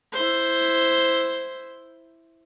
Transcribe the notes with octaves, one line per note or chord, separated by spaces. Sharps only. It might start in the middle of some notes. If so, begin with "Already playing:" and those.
E4 C5